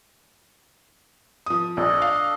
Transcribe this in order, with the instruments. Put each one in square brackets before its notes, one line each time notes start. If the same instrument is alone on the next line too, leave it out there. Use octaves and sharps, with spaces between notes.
[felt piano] F3 D#6
[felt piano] A#1 [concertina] D4 A4 D#5
[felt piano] F5